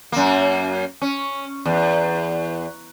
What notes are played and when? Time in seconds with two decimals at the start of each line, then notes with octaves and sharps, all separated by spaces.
0.12 F#2 A#3
1.02 C#4
1.65 E2